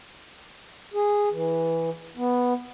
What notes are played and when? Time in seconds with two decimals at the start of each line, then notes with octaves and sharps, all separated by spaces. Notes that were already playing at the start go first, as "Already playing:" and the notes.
0.94 G#4
1.32 E3
2.17 B3